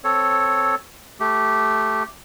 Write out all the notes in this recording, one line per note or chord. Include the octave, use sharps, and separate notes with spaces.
C4 A4 C#5
A3 G4